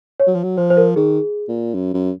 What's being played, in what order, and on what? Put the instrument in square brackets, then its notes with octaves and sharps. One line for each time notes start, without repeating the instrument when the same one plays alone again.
[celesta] C#5
[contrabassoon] F#3
F3
F#3
[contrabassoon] F3 [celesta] C5
[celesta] C5
A#4
[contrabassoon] D#3 [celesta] G#4
[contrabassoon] A#2
F#2
F#2